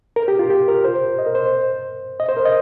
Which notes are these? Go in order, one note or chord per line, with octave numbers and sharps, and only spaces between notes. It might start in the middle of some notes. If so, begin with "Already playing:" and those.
A#4
G4
F4
G4
A#4
C5
D#5
A#4
C5
D#5
C5
A#4
D#5